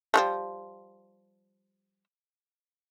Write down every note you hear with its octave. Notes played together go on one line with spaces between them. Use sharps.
F3 G3 A3